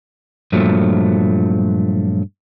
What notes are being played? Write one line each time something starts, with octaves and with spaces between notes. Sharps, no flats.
G2 A#2 F3 F#3 A3